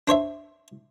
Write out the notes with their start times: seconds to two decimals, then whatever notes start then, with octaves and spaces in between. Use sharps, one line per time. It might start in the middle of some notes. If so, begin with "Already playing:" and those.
0.08 D4 C5 C#5 E5